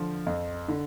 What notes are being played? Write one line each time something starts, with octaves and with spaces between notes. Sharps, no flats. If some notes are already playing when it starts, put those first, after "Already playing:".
Already playing: D3 F3
F2
D3